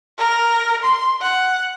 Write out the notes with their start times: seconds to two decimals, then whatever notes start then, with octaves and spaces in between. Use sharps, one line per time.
0.18 A#4
0.84 C6
1.22 F#5